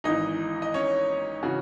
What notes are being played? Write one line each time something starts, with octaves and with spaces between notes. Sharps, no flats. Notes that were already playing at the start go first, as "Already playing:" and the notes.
G#1 G#2 E3 D#4 D#5
D#5
C#4 C#5
C#3 E3 F#4